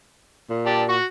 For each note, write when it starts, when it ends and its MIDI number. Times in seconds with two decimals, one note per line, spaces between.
0.50 0.98 46
0.66 0.83 67
0.66 0.83 74
0.66 0.83 81
0.89 1.04 66
0.89 1.04 85